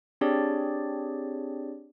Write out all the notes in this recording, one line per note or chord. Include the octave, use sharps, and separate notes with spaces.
C4 D4 G4 G#4 C#5 D5